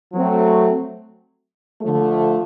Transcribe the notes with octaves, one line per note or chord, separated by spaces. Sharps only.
F#3 A3 C4
D3 F3 A3